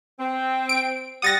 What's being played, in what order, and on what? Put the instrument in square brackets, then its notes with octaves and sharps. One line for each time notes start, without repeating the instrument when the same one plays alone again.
[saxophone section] C4
[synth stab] D7
[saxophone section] G3 F#5 [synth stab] D#6 A6 A#6